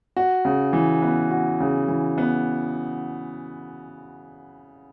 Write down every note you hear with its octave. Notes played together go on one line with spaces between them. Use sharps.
F#4
C#3
E3
B3
F#4
C#3
E3
B3